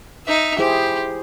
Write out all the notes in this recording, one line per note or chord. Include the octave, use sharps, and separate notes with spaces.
D#4 E5
E4 G4 G#4 C5